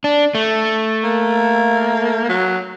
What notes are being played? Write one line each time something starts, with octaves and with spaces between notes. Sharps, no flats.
D4
A3
A#3
F#3